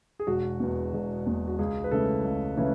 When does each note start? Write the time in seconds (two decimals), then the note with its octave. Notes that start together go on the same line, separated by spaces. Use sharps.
0.19 G#4
0.27 E1 F#4
0.60 E2 B2
0.94 E1
1.26 E2 B2
1.48 F#4
1.59 C#2 G#4
1.84 B4
1.91 C#3 E3 A3 C#4 A4
2.24 C#2
2.57 C#3 E3 A3 C#4